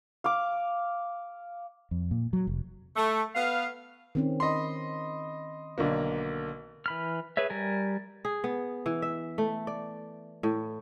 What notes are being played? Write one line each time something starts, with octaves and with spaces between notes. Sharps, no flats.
F5 D6
F2
A#2
F#3
F1
A3
B3 F5
D#3 C4 C#4
D#5 B5 C6
B1 D3 A#3
E3 B5 F6
G#4 B4 C#5 E5
G3 A#4 G#5
G#4
B3
E3
E5
A3
D5
A2